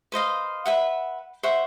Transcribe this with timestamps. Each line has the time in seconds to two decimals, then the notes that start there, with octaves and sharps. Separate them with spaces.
0.12 B4 C5 D#5 F5
0.66 B4 E5 F#5
1.43 C5 E5 F#5 C#6